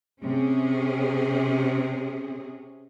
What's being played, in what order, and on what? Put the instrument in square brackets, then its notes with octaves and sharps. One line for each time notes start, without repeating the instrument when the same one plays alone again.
[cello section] C3 C#4 G#4